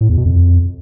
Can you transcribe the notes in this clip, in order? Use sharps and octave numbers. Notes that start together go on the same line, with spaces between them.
A2
E2
B2
F2